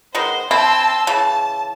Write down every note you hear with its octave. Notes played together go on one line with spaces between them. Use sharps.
D#3 G#3 B3 C5
C4 E4 A5 C6 E6
C#3 E3 A5